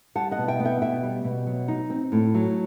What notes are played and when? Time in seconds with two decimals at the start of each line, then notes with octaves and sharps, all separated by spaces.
0.15 G3 F#5 A5
0.31 D#5 F#5
0.38 B2
0.48 E5 G5
0.60 B3
0.65 E5 G5
0.82 B2 E5 G5
1.03 G3
1.24 B2
1.47 F#3
1.68 D#4
1.90 C4
2.12 A2
2.34 F#3